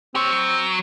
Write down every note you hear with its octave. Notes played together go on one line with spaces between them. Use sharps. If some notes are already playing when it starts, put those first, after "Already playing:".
C4 G4 C#5
F#3